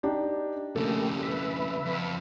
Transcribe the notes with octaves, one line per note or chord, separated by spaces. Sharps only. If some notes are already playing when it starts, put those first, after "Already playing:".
D4 D#4 G4
F2 C#3 A3 A#3 G4 A4
B4 E5
F2